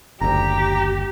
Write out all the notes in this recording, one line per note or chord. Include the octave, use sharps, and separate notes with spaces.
F#1 D2 G4 A#5